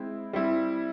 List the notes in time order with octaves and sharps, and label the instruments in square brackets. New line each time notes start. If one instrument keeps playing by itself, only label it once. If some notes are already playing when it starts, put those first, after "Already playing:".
Already playing: [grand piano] G#3 C4 E4
G3 C4 E4